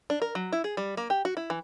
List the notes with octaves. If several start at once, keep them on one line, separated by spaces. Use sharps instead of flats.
D4
A#4
F#3
E4
G#4
G3
A#3
G4
F#4
E4
E3